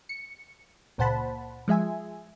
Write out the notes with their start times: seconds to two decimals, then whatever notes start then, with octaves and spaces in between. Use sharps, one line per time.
0.09 C#7
0.98 C#2 A#2 C5 F#5 A5 B5
1.68 F3 G#3 E5 G#5